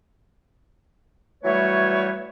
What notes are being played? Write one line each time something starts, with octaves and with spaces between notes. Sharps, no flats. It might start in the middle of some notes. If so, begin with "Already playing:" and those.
E3 F#3 G3 A3 B4 C#5